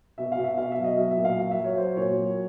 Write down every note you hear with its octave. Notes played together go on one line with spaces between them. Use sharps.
B2 E5
F5
B2
E5
B2 F5
E5
F#3
D#5
F#3 E5
E5
A#2
F5
F#3
E5
F#3
C#5
F#3 C5
A#2 C#5
F#3